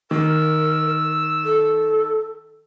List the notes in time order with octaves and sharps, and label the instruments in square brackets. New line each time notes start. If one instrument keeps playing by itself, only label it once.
[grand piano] D#3 [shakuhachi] A#4 [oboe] E6
[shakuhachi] A4